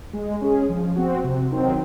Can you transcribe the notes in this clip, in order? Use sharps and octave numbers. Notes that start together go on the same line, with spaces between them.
G#3
C#4 G#4
F3
C4 F#4
C3
D#3 F#3 C4